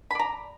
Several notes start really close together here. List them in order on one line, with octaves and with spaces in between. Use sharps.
B5 D5 A#5